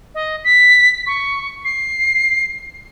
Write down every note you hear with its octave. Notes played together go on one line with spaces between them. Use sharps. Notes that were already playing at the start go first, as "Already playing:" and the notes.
D#5
B6
C#6
C7